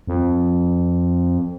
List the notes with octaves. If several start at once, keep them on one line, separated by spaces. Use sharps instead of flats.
F2